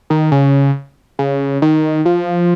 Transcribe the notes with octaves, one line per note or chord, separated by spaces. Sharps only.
D#3
C#3
C#3
D#3
F3